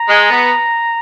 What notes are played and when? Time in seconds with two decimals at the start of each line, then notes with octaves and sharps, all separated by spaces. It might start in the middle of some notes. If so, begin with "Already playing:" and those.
Already playing: A#5
0.09 G#3
0.29 B3